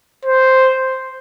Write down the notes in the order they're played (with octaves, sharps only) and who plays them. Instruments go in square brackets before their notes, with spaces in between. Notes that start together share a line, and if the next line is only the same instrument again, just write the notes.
[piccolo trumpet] C5